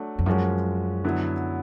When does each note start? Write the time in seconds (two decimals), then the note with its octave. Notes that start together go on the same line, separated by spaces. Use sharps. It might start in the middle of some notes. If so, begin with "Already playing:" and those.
Already playing: F#3 A3 D4
0.19 F2
0.26 F#2 F3 G#3 C#4 F#4
1.04 D3 F#3 B3 E4